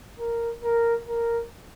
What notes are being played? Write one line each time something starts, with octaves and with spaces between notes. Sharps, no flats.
A#4
A#4
A#4